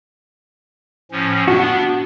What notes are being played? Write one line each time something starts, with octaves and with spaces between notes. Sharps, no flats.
A2 F3 C#4
B3 D4 F#4